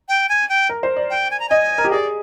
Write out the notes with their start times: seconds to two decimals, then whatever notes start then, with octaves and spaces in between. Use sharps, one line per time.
0.09 G5
0.29 G#5
0.49 G5
0.69 A#4
0.83 C5
0.96 D5
1.10 G5
1.31 G#5
1.40 A#5
1.49 D#5 G#5
1.78 A#4
1.84 G4
1.91 G#4 D5